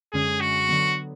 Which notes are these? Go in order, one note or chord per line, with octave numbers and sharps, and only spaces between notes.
F#2 D3 G#3 C#4 G#4
F#4
D3 F#3 B3